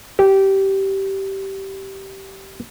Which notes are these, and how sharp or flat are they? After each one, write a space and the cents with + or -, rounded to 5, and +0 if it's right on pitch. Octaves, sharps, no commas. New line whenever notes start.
G4 -15